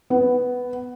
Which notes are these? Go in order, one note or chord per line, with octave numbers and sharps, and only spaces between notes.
B3